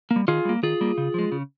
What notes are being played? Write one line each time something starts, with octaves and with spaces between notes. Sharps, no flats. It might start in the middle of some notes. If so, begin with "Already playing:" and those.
A#3
G3
D#3 F4 G#4
G3 A#3
D#3 F4 G#4
G3 A#3
C#3
F3 G#3
C#3